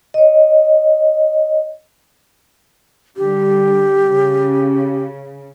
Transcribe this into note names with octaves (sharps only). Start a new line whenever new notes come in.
C#5 D#5
D3 G3 G4
C#3